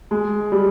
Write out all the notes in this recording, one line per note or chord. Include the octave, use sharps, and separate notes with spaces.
G#3
G3